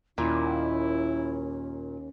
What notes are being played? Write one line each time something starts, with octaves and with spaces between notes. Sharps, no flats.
D#2 A#2 C#4 E4